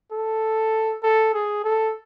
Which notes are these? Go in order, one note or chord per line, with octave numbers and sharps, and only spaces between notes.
A4
A4
G#4
A4